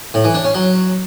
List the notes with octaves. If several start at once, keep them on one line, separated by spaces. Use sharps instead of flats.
A2
E3
D4
C#4
F#3